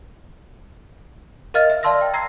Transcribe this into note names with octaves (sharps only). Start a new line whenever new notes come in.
A#4 D#5 F5 F6 A6
E5
D5 F5 A5 C6 E6 A#6
G5
A#5 E6 G#6 A#6 C7